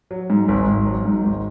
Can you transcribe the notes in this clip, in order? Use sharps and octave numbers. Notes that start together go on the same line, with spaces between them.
F#3
G#2
G#1
G#1
F#3
G#2
G#1